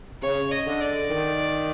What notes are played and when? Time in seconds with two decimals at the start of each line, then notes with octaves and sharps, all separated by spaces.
0.23 C#3 C#5
0.51 D#5
0.66 D3
0.80 D5
1.10 D#3